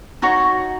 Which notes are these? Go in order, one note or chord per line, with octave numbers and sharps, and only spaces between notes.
D#4 F#4 C#5